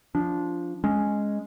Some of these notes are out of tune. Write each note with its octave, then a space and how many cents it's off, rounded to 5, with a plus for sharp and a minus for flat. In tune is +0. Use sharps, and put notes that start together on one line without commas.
F3 +0 D4 -15
G#3 +0 C#4 +0